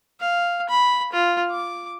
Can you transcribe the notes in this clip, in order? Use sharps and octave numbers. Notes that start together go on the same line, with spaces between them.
F5
B5
F4
D6